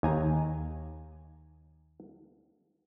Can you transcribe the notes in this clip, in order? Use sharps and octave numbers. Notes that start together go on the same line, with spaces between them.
D#2 G#5 A#5